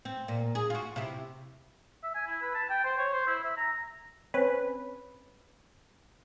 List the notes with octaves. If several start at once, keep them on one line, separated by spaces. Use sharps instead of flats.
C4
A#2
G#4
F4 F#4
C3 E4
E5
G#5
E4
B4
A5
G5
C5
C#5
C5
E4
E5
A#5
C4 C#4 B4